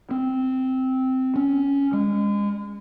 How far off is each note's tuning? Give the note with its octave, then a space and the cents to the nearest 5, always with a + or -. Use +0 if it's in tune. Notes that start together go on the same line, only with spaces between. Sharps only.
C4 -10
C#4 +10
G#3 -30